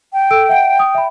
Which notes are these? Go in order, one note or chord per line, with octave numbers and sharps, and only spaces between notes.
G5
A4 E6 D7
E5 F#5 D7
D#6
E5 B5